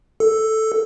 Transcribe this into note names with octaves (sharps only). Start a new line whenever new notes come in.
A4